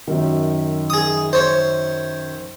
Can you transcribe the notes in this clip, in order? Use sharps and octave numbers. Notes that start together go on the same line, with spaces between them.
F#2 D#3
G#4 D#6
C5 C#5